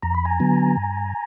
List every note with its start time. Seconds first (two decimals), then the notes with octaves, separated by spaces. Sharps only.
0.03 F2 A#5
0.15 B5
0.25 G#5 A#5
0.40 D3 F#3 B3
0.77 G2